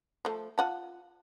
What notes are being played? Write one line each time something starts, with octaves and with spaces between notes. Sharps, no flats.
F3 A3
F4 F#5 A5